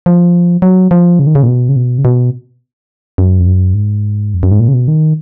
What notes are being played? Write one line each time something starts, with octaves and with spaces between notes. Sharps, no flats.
F3
F#3
F3
C#3
D#3
C#3
A#2
B2
C#3
B2
C#3
B2
F#2
F2
F#2
G#2
F2
F#2
G#2
A#2
C#3
B2
D#3